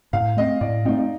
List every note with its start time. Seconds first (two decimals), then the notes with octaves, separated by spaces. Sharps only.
0.13 A2 F5
0.37 A3 C4 D#5
0.61 A2 D5
0.85 A3 C4 D#4
0.98 D#4